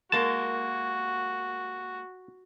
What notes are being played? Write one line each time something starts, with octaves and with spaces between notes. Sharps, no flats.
G#3 A#3 F#4 A#4 A5